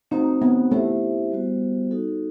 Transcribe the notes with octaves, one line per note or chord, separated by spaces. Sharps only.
A3 C4 D#4 F#4 C5
B3
A3 E4 G4 C5 E5
G3 B3 F#4 C5
D#4 F#4 A4